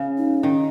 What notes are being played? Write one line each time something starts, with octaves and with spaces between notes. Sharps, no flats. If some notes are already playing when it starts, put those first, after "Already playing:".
Already playing: C#3
D#4
D#3 C#4